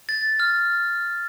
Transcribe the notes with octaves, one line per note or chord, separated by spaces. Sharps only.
A6
F6